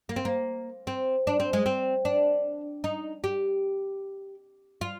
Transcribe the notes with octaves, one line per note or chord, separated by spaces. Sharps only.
A#3
C4
A#3
C4
D4
C4
G#3
C4
D4
D#4
G4
F4